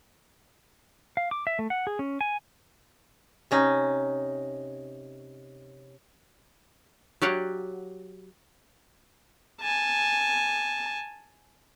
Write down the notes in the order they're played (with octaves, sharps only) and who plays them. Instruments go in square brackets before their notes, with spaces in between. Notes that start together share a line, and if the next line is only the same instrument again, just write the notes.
[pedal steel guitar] F5
D6
E5
A3
F#5
G#4
C#4
G#5
[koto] C3 C#4 D#4
F#3 G4 C#5 D5 F5 F#5
[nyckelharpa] G#5 A5